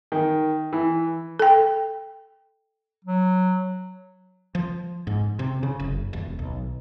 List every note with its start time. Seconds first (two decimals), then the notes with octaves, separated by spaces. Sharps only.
0.12 D#3
0.73 E3
1.39 A4 G5
3.05 F#3
4.55 F3
5.07 G#2
5.39 C3
5.63 C#3
5.80 F#1
6.13 D#1
6.39 B1